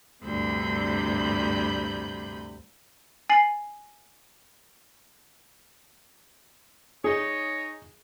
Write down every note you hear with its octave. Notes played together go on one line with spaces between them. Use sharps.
D2 G2 C3 B5 G6
G#5 A6 C7 F#7
D#4 G#4 C#5